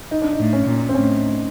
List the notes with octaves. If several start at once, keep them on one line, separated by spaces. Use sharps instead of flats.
D#4
D4
D#4
A2
C#4
A#2
C4
A2 C#4